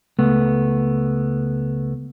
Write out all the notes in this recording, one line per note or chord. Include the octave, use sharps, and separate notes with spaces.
C#2 A3 B3